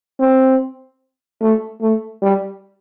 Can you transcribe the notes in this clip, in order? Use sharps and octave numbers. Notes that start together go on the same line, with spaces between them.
C4
A3
A3
G3